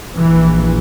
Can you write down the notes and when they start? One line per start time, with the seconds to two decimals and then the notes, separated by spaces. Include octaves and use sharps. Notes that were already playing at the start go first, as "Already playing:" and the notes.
0.18 A#1 A#2 E3